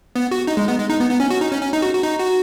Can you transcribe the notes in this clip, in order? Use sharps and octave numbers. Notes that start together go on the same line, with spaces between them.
B3
F#4
D#4
G#3
B3
G#3
D#4
B3
B3
C#4
F#4
D#4
C#4
C#4
D#4
F#4
F#4
D#4
F#4